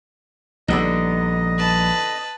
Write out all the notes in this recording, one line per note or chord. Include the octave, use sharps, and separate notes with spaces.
A#1 D3 G3 B3 D#4 D#5
B4 A5